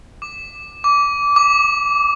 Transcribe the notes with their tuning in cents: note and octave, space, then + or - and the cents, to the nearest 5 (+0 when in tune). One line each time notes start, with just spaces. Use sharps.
D6 +15
D6 -25
D6 +10